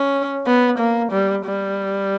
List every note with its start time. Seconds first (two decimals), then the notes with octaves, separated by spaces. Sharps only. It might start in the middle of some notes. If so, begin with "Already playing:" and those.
Already playing: C#4
0.46 B3
0.79 A#3
1.12 G3
1.45 G3